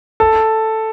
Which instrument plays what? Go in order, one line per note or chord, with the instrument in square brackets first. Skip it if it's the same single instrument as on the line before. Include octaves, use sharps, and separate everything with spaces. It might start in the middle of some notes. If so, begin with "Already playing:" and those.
[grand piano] A4